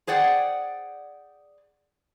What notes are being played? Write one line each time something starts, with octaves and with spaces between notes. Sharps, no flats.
G#4 C5 D5 F#5 G5